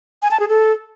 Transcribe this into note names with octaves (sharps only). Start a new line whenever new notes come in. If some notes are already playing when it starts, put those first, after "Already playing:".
G#5
A5
G#4
A4